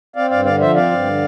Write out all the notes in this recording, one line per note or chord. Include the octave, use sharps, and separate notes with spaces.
C4 D5 F5
G2 D5 F5
D3 D5 F5
F3 C5 E5
C4 D5 F5
G2
D3